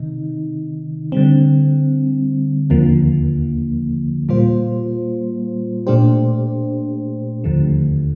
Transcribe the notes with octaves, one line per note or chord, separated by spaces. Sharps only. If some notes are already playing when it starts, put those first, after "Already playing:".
Already playing: C3 D#3 D#4
D3 G3 C4
D#2 D3 F3 A#3
A#2 G3 A#3 F4 C5
A#2 A3 D4 G4 C5
D#2 D3 F3 A3